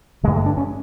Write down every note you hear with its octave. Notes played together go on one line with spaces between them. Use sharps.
G2 D3 G#3
A3
D4
C#4